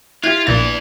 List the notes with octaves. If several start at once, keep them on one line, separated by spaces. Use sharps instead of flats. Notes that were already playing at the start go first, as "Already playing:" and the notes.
E4 F4 G4 F6 G#6 F7
A#1 A#2 E3 B3 D4 A6